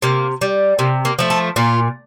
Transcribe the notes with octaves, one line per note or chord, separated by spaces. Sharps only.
C3 A#3
G3
C3 A#3
A#3
F3 A3
A4
A#2 F4